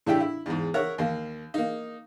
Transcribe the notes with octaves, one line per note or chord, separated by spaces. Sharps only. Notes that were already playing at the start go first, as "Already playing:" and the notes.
A2 D4 E4 G4 G5
E4
E2 G#2
A#4 C#5 E5 F#5
D#2 A#3
A#3 D#4